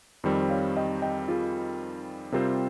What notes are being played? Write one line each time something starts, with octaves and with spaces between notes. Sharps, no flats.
F2 D#3 G3 C4
C#5 F5
D#5 G5
D#5 G5
F4 G#4
C3 G3 C4 F4 G4 A#4 C5